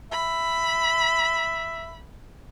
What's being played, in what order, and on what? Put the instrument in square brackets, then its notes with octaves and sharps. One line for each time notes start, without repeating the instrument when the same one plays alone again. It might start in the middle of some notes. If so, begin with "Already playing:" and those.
[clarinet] E5 [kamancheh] B5